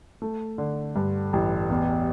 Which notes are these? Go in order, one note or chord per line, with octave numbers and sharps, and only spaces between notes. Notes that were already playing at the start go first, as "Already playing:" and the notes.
A3
D3
G2
A1
E2